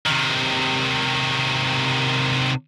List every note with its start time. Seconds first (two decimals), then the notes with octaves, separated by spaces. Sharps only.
0.07 C3 D#3